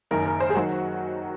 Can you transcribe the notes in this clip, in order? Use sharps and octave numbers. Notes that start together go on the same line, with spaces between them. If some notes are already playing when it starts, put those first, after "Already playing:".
F#1 F#2 D#3 A#4
A#4
C5
G#4
D#3 F#3 F#4